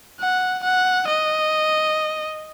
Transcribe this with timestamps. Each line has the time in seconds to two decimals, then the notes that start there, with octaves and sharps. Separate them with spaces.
0.20 F#5
0.63 F#5
1.07 D#5